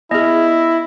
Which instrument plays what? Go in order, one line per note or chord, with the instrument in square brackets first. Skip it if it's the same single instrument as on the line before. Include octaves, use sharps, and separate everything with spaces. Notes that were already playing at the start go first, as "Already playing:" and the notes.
[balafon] B3 G#4 [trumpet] E4 [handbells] D#5